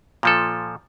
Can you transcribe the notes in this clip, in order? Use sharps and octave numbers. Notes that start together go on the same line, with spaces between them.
A#2 F3 A4